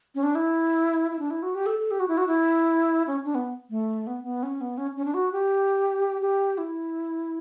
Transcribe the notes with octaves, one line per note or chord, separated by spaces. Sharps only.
C#4
D4
E4
E4
D4
E4
F#4
G4
A4
A4
G4
F#4
E4
F#4
E4
C#4
D4
B3
A3
B3
B3
C#4
B3
C#4
C#4
D4
F#4
G4
G4
E4